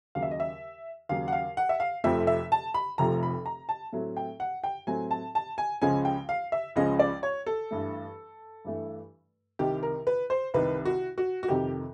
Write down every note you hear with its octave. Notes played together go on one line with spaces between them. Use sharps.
D#2 C#3 F#3 F5
E5
D#5
E5
D#2 C#3 F#3 F5
F#5
F5
F#5
E5
F5
F1 F2 C3 F3 A3 E5
E5
A5
B5
F1 F2 C3 F3 A3 A#5
B5
A#5
A5
A2 F#3 A3 C4
G5
F#5
G5
A2 F#3 A3 C4 G#5
A5
A5
G#5
C#2 C#3 F3 G#3 C#4 G#5
G5
F5
E5
C#2 C#3 F3 G#3 C#4 D#5
D5
C#5
A4
G2 E3 A3
G2 E3 A3
C2 C3 D#3 G4
A#4
B4
C5
C2 C3 D#3 B4
F#4
F#4
F#4
F2 C3 D#3 G4